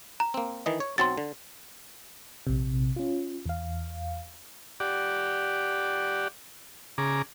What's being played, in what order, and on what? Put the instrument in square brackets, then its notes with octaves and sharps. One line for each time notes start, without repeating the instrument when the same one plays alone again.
[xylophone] A#5
[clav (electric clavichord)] A#3 C4
D#3 E3 D#5
C#5
[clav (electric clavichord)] B1 F#3 C4 [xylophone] C6 A6
[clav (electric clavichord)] D3
[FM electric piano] A#1 C3
C#4 F4
E2 F5
[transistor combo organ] G4 D5 F#5
C#3 G#4 A#5 D6